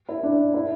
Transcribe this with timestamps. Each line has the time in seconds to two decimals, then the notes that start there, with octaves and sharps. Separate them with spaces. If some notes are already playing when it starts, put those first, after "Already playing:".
0.09 E4
0.23 D4
0.54 E4